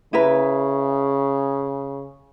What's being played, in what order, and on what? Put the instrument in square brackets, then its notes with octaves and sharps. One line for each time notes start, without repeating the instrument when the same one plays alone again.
[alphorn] C#3 [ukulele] E4 A#4 B4